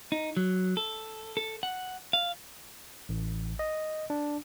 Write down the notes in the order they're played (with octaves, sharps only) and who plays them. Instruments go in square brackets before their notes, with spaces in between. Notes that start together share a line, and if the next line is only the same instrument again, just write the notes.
[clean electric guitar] D#4
F#3
A4
A4
F#5
F5
[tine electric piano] A1
D#5
D4